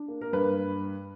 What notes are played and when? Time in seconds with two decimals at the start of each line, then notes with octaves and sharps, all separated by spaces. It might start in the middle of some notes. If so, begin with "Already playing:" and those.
Already playing: D4
0.08 A#3
0.21 A#4
0.33 G2 B4